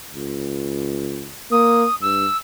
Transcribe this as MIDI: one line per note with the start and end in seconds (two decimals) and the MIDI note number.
0.14 1.31 37
1.51 1.85 58
1.51 1.95 87
2.01 2.26 43
2.01 2.37 88